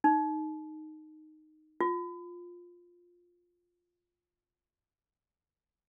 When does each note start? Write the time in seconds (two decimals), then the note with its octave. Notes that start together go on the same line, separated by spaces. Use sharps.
0.04 D#4
1.80 F4